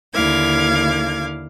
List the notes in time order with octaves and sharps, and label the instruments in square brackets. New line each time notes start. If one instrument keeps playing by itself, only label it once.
[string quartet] D#2 D3 E4 F5 D6 G#6